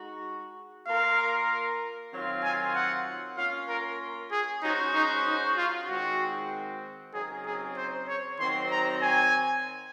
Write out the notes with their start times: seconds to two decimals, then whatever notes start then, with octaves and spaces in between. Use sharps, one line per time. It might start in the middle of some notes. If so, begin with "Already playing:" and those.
Already playing: G#3 D#4 F#4
0.87 A#3 F4 A#4 F5
2.13 D#3 F#3 C4 F4
2.43 G#5
2.75 F#5
3.37 A#3 C#4 F4 F5
3.69 A#4
4.31 G#4
4.62 G#3 C#4 D#4 F#4 C5
4.94 D#4
5.26 D#4
5.57 F4
5.88 D#3 G#3 C4 F#4
7.13 C#3 F#3 C4 D#4 G#4 A#4
7.46 G#4
7.77 C5
8.08 C#5
8.39 D#3 F#3 C4 F#4 C6
8.71 A#5
9.02 G#5